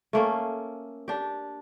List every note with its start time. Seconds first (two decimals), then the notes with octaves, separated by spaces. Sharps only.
0.13 A3 A#3 C#4
1.08 D4 G4